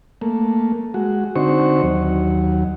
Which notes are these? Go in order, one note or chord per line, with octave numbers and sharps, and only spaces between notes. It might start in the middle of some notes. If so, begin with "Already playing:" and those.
A3 A#3
G#3 F#4
D3 C4 D#4 F#4 C5 C#6
D#2 F#3